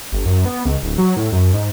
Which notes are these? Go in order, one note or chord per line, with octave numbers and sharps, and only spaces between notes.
G1
F#2
B3
C#2
D1
F#3
A2
F#2
G#2